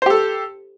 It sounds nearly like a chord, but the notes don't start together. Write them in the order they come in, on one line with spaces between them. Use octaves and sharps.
C5 G4 A4